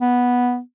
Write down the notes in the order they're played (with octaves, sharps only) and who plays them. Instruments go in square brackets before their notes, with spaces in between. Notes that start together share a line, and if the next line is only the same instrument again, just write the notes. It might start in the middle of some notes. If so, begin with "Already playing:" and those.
[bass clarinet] B3